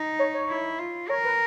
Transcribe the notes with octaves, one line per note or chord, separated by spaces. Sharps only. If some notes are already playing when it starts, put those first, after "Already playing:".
Already playing: D#4
C#5
C#5
E4
F4
A#4 C#5
B4